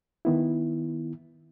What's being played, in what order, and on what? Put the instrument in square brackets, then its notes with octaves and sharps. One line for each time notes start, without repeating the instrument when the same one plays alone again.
[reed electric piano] D#3 B3 E4